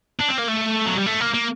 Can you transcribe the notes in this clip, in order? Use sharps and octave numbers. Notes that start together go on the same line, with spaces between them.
D4
C4
A#3
A3
F#3
G3
A3
A#3
A#3